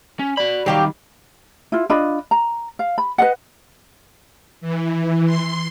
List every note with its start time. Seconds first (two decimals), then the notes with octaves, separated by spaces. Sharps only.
0.19 C#4
0.37 F#4 D5 B5
0.66 D#3 F#3 G3 G4 F5
1.72 E4 F4
1.90 D4 F4 D#5 B5
2.31 A#5
2.79 F5
2.98 B5
3.18 B4 D#5 F#5
4.61 E3
5.26 C6